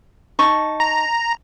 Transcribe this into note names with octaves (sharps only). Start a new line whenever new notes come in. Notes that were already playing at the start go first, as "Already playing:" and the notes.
D#4 A5 C#6
A#5